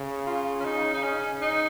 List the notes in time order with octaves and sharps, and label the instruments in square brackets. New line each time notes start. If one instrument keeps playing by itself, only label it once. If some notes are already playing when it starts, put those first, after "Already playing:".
Already playing: [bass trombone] C#3
[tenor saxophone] F4
C#4
D#4
D#4
C#4
D#4